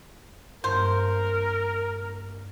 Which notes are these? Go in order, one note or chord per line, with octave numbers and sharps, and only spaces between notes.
G2 A#3 A#4 C5